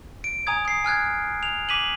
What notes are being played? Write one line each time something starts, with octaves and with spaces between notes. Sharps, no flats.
D7
G#5 A#5 D#6 G#6
D#6 C7
G#5 F6 F#6 G#6
F7
D6 B6 D#7 F#7